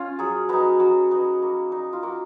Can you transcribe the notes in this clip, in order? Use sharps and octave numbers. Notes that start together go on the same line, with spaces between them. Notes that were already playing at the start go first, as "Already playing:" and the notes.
Already playing: C#4 F4
F#3 G#4
B3 D#4 F#4
F#3
B3 D#4
A#3
D#4
F4
A#3 F#4